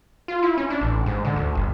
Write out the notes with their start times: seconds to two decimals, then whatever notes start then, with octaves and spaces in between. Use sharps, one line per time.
0.28 F4
0.43 E4
0.57 C#4
0.70 D4
0.81 A1
1.06 G#2
1.25 D3
1.36 D2
1.55 G1